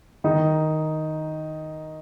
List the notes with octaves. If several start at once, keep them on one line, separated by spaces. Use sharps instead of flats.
D#3 D#4